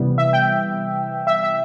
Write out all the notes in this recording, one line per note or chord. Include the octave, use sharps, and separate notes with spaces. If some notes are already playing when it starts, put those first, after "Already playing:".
Already playing: C3 E3 G3 B3
E5
G5
E5
E5